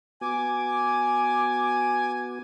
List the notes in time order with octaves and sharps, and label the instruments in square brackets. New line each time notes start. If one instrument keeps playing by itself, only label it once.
[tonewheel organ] B3 F#4 [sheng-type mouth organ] G#5 [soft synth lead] D6